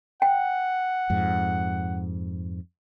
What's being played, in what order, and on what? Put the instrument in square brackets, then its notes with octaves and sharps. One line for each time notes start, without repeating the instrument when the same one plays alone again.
[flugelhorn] F#5 [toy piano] G5
[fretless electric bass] F2 G#2